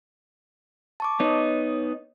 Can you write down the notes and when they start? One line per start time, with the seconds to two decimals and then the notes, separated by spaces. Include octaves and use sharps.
1.00 A5 C#6 D6
1.20 B3 D#4 C#5 D#5